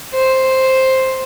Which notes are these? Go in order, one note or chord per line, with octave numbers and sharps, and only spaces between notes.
C5